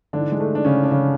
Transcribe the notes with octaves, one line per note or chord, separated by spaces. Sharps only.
G#2 D3 E3 D4
G#3
A3
D4
C#3 C#4
D4
C#3 C#4